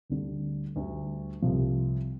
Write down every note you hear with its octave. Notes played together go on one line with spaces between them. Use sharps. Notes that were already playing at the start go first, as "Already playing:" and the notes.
D2 D3 G3
D2 D3 G3
C2 C3 F3